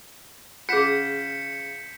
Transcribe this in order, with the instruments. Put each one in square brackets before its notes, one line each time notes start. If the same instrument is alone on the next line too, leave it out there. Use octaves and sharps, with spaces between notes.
[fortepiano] C#3 F#5 [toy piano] F4 G#4 [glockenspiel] G6 B6 E7 [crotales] C#7